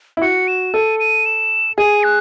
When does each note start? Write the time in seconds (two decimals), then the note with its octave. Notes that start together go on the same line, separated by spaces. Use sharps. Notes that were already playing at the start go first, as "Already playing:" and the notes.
0.17 E4
0.22 F#4 C#7
0.48 E7
0.74 A4 D#7
1.00 D#7
1.26 E7
1.78 G#4 D#7
2.04 F#6